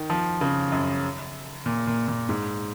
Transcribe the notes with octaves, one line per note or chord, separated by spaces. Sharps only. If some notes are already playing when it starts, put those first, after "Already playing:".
Already playing: D#3
F3
C#3
F#2
A#2
A#2
A#2
G#2